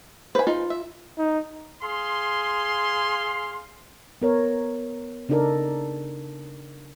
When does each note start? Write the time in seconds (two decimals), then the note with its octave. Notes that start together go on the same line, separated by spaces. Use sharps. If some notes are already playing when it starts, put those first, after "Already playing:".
0.35 B4 C5 G#5 B5
0.47 D#4 F4
0.70 E5
1.18 D#4
1.82 G#4 F5 C6
4.22 B3 A#4 C#5
5.29 C#3 D4 D#4 A4 A#4 D5